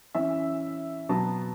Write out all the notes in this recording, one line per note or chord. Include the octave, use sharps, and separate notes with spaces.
E3 C#4 E5
B2 F#3 B3 A5